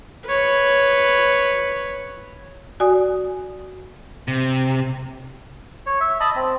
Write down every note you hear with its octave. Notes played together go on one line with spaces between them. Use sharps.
B4 C#5
F#4 D5 G#5 D#6
C3
C#5
E5
D#5 A5 B5
C4